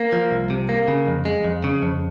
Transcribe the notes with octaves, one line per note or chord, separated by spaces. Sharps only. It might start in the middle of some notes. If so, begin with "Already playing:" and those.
Already playing: A#3
F3
C2
C3
A#3
C#3
F2
G#3
F2
C#3
F2